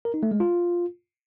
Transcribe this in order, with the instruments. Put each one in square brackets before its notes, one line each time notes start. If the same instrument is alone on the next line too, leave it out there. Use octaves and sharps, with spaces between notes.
[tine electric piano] A#4
D#4
A3
G#3
F4